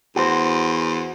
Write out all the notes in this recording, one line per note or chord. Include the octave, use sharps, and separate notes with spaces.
E2 F#4 C5